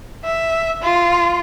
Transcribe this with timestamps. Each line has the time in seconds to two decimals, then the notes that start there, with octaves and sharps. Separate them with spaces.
0.24 E5
0.83 F4